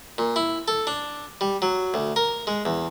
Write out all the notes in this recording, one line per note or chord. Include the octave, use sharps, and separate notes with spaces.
A#2
E4
A4
D4
G3
F#3
D2
A#4
G#3
E2